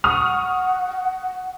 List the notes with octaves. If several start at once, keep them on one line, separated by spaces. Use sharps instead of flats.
F#5 C#6 D#6 F6